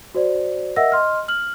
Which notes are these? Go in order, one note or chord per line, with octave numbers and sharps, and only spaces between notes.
F#4 C5 D5
A#4 D#5 E5 F#5 E6 A#6
D#5 C6 F6
F6 F#7